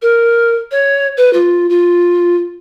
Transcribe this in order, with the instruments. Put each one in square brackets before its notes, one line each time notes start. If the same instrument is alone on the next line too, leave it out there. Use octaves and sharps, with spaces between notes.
[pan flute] A#4
C#5
B4
F4
F4